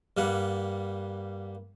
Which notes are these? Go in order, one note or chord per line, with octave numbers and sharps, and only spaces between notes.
G2 G3 A#3 F#5